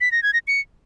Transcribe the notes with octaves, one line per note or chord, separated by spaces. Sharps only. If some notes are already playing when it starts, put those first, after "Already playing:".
B6
A#6
G#6
A#6
C#7